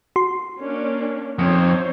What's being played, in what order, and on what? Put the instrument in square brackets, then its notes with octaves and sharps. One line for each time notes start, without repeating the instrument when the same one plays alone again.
[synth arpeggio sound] F#4 C6
[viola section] A#3 C#4 D4
[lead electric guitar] F2 [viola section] D#4 C5 C#5